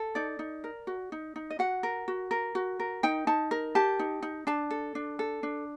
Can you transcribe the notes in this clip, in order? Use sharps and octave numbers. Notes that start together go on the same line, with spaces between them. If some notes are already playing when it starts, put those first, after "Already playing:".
Already playing: A4
D#4 D5
D#4
A#4
F#4
D#4
D#4
D#5
F#4 F#5
A#4
F#4
A#4
F#4
A#4
D#4 G5
D#4 A5
A#4
G4 A5
D#4
D#4
D4 A5
A4
D4
A4
D4